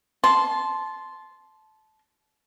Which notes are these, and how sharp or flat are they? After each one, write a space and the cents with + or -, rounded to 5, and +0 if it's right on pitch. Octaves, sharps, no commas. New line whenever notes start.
A5 -20 C6 +0